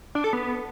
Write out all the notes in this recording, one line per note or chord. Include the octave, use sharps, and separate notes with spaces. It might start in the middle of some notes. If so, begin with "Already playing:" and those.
D4
A4
B3